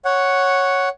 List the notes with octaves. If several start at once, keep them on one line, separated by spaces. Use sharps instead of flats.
C#5 F#5